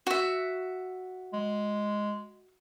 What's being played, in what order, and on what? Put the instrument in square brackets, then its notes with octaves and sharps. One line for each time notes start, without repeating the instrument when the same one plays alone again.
[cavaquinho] F#4 E5
[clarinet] G#3